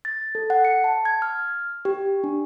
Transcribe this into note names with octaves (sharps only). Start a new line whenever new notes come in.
A6
A4
F#5
C#7
A5
G#6
F6
G4
D4